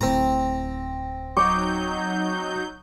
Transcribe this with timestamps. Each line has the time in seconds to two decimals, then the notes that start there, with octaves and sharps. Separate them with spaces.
0.01 D1 A2 C4 A#5
1.37 F#3 D#4 C#6 D6 G6